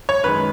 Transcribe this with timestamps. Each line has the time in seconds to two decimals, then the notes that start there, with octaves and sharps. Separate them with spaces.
0.09 C#5
0.24 F#2 D#3 G#3 B4